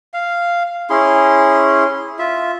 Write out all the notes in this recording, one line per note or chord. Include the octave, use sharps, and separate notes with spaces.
F5
C#4 E4 G#4 C6
F4 E5